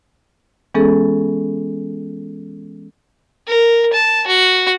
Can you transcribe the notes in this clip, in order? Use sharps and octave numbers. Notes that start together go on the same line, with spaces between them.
E3 G#3 B3 C#4 G#4 A4
A#4
A5
F#4